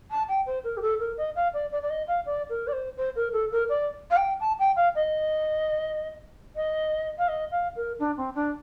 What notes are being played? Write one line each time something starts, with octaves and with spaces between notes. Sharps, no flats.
A5
G5
C5
A#4
G4
A4
A#4
D#5
F5
D5
D5
D5
D#5
F5
D5
A#4
D5
C5
C5
A#4
A4
A#4
D5
F5
G5
A5
G5
F5
D#5
D#5
F5
D#5
F5
A#4
D4
C4
D4